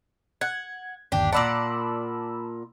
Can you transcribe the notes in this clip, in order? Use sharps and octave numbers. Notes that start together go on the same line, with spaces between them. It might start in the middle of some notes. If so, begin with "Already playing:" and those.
F#5 G#6
G1 D#2 D4 G4
A#2 D5 F#5 A5 B5 E6